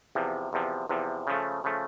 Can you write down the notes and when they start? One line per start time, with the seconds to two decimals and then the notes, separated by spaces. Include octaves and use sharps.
0.15 E2 C3 F3
0.53 E2 C3 F3
0.89 E2 C3 F3
1.27 C#3 F3 A3
1.64 C#3 F3 A3